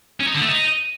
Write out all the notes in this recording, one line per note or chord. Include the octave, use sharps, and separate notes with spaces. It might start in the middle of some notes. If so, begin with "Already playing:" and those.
C#4
D#4
D3
A3
D#4